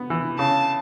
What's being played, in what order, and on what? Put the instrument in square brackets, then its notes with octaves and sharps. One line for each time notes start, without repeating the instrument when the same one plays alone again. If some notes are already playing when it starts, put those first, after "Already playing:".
Already playing: [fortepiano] B3
E3
[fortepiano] C#3 [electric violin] A5